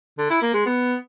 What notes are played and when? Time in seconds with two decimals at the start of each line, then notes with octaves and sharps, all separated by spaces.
0.18 D3
0.30 E4
0.42 A#3
0.54 G#3
0.66 B3